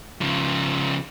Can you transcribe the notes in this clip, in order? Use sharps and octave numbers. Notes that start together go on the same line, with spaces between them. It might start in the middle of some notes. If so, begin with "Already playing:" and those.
C#3 F3